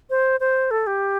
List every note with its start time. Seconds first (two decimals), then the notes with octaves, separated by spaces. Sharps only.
0.10 C5
0.40 C5
0.71 A4
0.87 G4